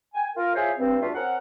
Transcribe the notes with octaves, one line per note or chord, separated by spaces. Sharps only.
G5 G#5
F4 A#4
E4 F4 G#4 C5 C#5 E5
G2 C4
E2 A3 D4 F4 F#4 E5
C4 C#4 A#4 F#5